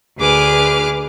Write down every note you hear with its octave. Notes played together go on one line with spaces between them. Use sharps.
D2 G#4 B4 D6 F6